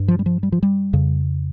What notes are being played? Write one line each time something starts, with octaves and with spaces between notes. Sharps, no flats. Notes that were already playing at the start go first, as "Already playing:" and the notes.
Already playing: G2
F3
G3
F3
G3
F3
G3
F2 C#3